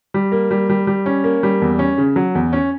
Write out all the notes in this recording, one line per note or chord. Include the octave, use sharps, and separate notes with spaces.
G3
A#3
G3
G3
G3
C#4
A#3
G3
E2
C#4
C#3
F#3
E2
C#4